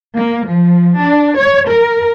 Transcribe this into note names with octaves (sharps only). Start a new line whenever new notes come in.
A#3
F3
D4
C#5
A#4